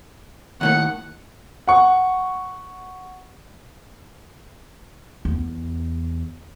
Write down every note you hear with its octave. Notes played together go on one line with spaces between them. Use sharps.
D#2 A2 D#3 F#5 C#7
F#5 C#6
E2